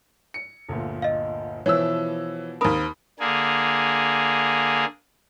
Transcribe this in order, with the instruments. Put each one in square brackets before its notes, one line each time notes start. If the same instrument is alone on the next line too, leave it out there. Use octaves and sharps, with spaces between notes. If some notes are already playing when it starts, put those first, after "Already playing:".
[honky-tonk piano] C#7
[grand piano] G1 D2 A#2
[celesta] D#5 F5
[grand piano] B2 F3 E4 [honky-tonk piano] E3 E6 [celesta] C#5
[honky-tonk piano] D#2 A#4 [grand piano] C4 [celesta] B5 D#6
[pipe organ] D3 A#3 G#4